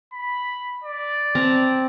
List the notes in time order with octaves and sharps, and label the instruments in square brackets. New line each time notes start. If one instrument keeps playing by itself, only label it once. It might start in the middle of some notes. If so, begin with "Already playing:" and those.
[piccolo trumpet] B5
D5
[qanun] C4 A5 A#5